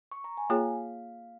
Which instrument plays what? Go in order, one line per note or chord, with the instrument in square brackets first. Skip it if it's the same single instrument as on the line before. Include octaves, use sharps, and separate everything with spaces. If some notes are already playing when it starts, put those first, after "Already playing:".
[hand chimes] C#6
A#5
G#5
[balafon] A#3 F4 G#4 C#5 [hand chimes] F5